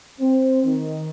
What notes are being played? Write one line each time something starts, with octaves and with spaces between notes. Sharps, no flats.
C4
D#3